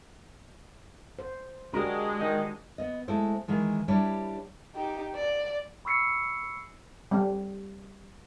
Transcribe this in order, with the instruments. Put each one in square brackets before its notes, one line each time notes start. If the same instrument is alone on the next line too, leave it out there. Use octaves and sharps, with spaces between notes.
[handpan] C5
[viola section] G#3 [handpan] D4 F#4 G4 [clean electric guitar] A#4
[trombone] D#3 [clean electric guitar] D#4
[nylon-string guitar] B3 D#5
G#3 A3 E4 C5
D#3 E3 G#3
G3 D4 E4 G4 B4 C#5
[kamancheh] D#4 G4
D5
[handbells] B5 C#6 E6 C7 C#7
[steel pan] G3 C4